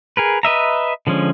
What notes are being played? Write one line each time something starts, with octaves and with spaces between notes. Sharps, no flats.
G#4 A#4 B4
B4 D#5 E5 A#5
D3 F3 G#3 C#4